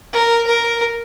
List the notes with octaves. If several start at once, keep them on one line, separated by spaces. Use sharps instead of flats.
A#4
A#4